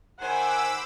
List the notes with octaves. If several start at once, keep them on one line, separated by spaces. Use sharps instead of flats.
D#3 C5 F#5 G#5 B5 D6 E6